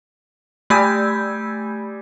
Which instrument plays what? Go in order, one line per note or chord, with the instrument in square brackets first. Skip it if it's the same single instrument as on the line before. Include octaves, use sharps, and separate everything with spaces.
[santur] G3 G#5 D#6 [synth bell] A3 E6 G6